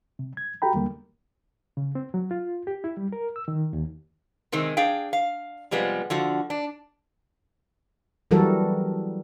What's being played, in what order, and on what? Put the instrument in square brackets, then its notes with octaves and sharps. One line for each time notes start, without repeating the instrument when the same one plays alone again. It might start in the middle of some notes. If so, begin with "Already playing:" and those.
[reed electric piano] C3
G#6
F#4 G4 A4 G5 A#5 B5
D#2 D3 G3 A#3
C#3
C4
F#3
F4
G4
E4
G3
A#4
E6
D#3
D#2
[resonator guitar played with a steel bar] C3 D#3 G#3 C4
D4 G#4 F5 G5
F5
C3 F3 G3 G#3 B3
D3 F3 F#4
D4
[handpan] E3 F#3 G3 F#4 A4 A#4